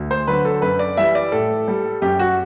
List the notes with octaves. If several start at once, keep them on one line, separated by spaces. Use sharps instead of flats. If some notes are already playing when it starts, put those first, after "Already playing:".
Already playing: D2
C5
D3 F#3 B4
A4
F#2 B4
D5
E3 G3 E5
D5
A2 A4
G3
F#2 G4
F#4